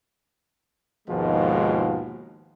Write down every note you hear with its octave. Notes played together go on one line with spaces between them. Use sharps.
A#1 D#2 G#2 B2 F3 G#3